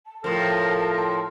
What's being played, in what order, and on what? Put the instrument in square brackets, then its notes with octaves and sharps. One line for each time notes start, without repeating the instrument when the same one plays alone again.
[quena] A5
[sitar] A2 F3 [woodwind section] F4 A4 A#4